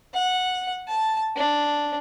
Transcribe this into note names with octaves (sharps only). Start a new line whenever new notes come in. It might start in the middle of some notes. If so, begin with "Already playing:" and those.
F#5
A5
D4